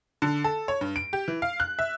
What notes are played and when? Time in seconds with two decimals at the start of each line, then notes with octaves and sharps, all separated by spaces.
0.22 D3
0.44 A4
0.68 C#5
0.81 G2
0.96 D7
1.13 G4
1.28 E3
1.42 F5
1.60 F#6
1.79 E5